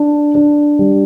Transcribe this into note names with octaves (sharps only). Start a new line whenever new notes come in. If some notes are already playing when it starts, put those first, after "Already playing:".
Already playing: D4
D4
G3